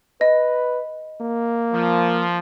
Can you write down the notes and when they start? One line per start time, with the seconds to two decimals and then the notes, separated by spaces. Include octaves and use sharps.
0.21 B4 D#5
1.21 A#3
1.73 F3